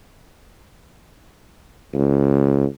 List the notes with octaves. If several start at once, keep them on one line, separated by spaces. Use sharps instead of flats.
C#2